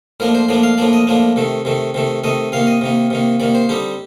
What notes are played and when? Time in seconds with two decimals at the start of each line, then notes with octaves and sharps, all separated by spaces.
0.20 A2 F3 A#3 D4 A#4
0.35 C5
0.49 A2 F3 A#3 D4 D5
0.63 F5
0.78 A2 F3 A#3 D4 D5
0.93 D#5
1.07 A2 F3 A#3 D4
1.36 C3 D#3 A3
1.65 C3 D#3 A3
1.94 C3 D#3 A3
2.24 C3 D#3 A3 D#5
2.52 C3 D#3 A#3 F5
2.67 D#5
2.81 C3 D#3 A#3
3.10 C3 D#3 A#3
3.40 C3 D#3 A#3 D5
3.55 C5
3.69 D3 G3 C4 D#4 G4